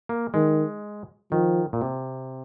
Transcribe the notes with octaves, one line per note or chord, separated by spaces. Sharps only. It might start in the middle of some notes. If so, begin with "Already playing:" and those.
A#3
D#3 G#3
D#3 F3
A#2
C3